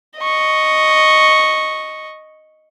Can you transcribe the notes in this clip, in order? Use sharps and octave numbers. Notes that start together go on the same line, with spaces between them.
D#5 C#6